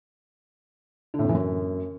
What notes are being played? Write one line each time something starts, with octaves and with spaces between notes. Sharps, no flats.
D3
A2
F2
E3
F#2